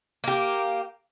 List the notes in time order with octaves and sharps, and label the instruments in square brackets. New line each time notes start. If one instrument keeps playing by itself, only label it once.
[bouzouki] A#3 G4